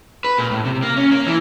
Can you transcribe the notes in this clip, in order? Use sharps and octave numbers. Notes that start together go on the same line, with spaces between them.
B4
A#2
A2
C3
A#3
C#4
A#3
E3